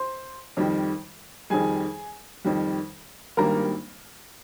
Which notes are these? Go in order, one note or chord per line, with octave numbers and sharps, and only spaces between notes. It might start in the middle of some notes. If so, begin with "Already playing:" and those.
Already playing: C5 C6
F2 D#3 G3
F2 D#3 G3 G#4 G#5
F2 D#3 G3
G#1 G2 D#3 G3 A#3 A#4 A#5